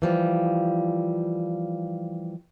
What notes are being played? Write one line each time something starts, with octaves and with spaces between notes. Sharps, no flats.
E3 F3 G3